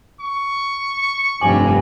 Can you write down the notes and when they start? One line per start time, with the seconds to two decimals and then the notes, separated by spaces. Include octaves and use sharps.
0.21 C#6
1.41 F1 G2 G#5 D6 F#7